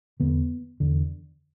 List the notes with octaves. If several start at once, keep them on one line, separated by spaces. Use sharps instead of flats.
E2 D3 B3
E2 D3